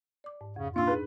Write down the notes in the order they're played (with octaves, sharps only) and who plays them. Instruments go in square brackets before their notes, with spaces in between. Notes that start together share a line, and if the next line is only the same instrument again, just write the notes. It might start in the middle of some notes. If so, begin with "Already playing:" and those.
[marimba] D5 D6
G#2
[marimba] F2 [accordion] C#3
[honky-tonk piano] A#2 [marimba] D4 D#4 E6 [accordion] F4
[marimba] D#4 G#4 [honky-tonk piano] B4